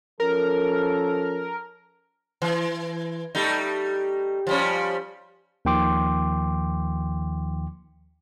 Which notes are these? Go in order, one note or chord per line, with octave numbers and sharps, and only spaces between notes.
F3 C#4 A4 A#4
E3
G3 A3 D#4
F3 G3 C#4
D#2 D#3 F3 G5 C6 D6